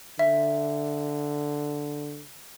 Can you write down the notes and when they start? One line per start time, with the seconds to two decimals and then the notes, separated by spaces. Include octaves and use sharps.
0.19 D3 E5